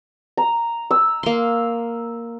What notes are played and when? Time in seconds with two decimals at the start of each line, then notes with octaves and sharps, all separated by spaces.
0.37 A#5
0.91 E6
1.23 A#3 C6